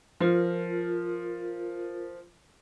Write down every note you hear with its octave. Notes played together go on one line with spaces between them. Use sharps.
F3 F4 A#4